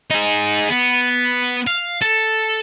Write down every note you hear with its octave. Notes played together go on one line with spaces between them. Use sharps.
D#4 G#4
B3
F5
A4